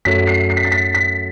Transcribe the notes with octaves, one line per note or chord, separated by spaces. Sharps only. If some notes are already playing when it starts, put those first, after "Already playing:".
F#2 F#3 A3 B6
C7
C7
B6
A6
B6
B6